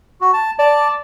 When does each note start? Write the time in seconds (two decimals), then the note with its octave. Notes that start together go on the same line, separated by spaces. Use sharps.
0.21 F#4
0.33 A5
0.59 D5 A5